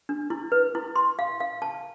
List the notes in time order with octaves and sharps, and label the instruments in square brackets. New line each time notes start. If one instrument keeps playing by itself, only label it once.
[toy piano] D4
E4
B4
E4
C6
F5
F5
A5